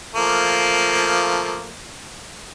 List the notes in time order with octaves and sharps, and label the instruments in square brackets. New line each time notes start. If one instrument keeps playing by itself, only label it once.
[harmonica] F3 A3 A#3